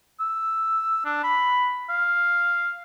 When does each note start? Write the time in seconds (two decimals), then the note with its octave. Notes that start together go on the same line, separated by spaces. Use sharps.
0.20 E6
1.05 D4
1.24 B5
1.90 F5